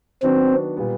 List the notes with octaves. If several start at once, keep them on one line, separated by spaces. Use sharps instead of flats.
D#3 F#3 B3 C4 D4 F#4
A#2 G3 B3